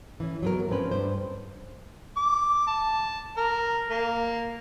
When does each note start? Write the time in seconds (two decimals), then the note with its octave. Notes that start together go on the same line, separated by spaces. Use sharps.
0.20 E3 C#4
0.42 F#3 B3 A#4
0.69 F3 A3 C4 C#4 B4
0.91 G2 C5
2.17 D6
2.67 A5
3.37 A#4
3.90 A#3